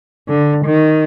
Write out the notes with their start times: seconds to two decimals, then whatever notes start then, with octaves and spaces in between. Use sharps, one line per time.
0.28 D3
0.65 D#3